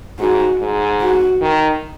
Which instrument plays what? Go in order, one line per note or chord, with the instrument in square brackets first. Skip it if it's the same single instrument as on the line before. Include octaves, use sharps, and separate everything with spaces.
[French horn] G#2 [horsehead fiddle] F#4
[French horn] G#2
[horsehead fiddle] F#4
[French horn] D#3